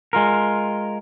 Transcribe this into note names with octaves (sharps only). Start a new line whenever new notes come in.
G#3 F4 A#4